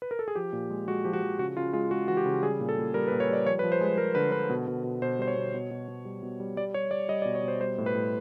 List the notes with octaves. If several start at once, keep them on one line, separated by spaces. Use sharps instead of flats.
B4
A#4
A4
G#4
F3 G4
A#2
G#3
G#3 F#4
F3 G4
F#4
F3
C#3 F#4
C#3 F4
G#3 F4
G#3 F#4
E3 F#4
G4
C#3
G3 G#4
A#2
A4
A#2
G3 A#4
B4
A#2
C#5
G3 D5
F3 C#5
B4
F3
C5
G#3 B4
G#3 A#4
D3 B4
D3 B4
B2
B2
B2
B2 C5
G3 C5
C#5
B2
B2
B2
B2
G3
B2
G3
G3 D5
G3 C#5
G3 D5
G3 D#5
D5
B2
C#5
B2
C5
G3 C5
A2
B4
A2